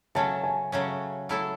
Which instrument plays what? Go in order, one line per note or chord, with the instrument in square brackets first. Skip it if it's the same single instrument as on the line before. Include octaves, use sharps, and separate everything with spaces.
[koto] C#3 F#3 A3 C#4 [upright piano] A5
[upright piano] G#5
[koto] C#3 F#3 A3 C#4
F#3 A3 E4 A4